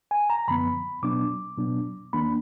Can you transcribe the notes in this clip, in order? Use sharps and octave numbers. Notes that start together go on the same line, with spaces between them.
G#5
A#5
F#2 D3 F3 B3 B5
B2 F#3 B3 D4 D6
B2 F#3 B3 D4
D#2 D#3 A#3 D4 B5